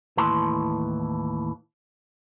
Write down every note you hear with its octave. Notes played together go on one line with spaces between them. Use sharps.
D#2 A2 E3 A5 C6